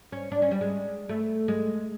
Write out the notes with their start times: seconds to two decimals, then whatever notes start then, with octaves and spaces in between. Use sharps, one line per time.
0.12 C#4
0.32 D4
0.42 C#4
0.51 G3
0.61 G#3
1.09 A3
1.48 G#3